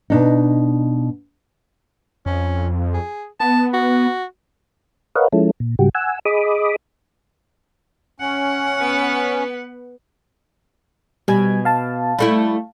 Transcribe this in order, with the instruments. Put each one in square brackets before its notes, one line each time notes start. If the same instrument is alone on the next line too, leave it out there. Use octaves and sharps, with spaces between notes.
[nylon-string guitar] B2 D4 D#4
[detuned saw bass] F2 [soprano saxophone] C#4
[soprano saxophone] G#4
[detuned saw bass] B3 [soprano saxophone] A5
[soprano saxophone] F#4
[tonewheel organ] A#4 B4 C#5 D#5 F5 F#5
F3 G#3 C#4 E4 A4
A#2
G#2 C#3 G3 F#4 G4
F#5 G#5 E6
G#4 D#5 B5 D6 D#6
[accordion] C#4 [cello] F#5
[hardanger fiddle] B3 B4
[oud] B2 [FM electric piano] G3 G#5 G#6
[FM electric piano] F5 A5
[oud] G3 A3 E4